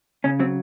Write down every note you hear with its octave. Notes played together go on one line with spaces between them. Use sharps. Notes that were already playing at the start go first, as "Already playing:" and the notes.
C#3 C#4
F#3 C4